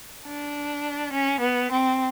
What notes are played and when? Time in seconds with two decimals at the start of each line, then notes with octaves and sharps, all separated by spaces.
0.24 D4
1.12 C#4
1.40 B3
1.70 C4